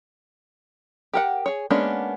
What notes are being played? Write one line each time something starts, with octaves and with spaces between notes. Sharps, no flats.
G4 A#4 F#5
G#4 C#5
G#3 A#3 B3 C#4 D4